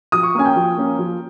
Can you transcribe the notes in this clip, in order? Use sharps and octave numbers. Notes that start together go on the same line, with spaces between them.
F3 D#6
C#6
A#3 C#4 G#5
G5
F3
A#3 C#4
F3